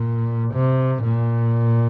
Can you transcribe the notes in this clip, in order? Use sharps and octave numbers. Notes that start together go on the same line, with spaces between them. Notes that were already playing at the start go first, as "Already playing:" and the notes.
Already playing: A#2
C3
A#2